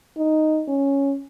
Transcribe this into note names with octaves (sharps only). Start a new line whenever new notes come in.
D#4
C#4